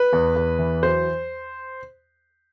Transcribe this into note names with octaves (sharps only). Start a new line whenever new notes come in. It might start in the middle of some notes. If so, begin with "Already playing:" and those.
Already playing: B4
E2
E2
E3
F#3 C5